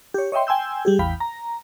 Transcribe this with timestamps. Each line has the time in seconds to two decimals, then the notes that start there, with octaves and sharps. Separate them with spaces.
0.14 G4 C#5
0.32 C#5 D#5 E5 G5 C6
0.47 G5 G#5 C6 E6 G6
0.85 G3 G4 G#4
0.99 A1 E2 F5 G5 B5
1.20 A#5